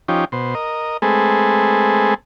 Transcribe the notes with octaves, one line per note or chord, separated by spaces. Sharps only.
F3 C#4 D#4 G4
B2 C5
A#4 D#5
G#3 A3 C4 G#4 A4 B4